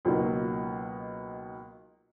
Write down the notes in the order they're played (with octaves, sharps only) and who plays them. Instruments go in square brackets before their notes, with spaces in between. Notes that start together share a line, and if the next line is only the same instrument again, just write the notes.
[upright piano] C#2 B2 F#3 A#3 D#4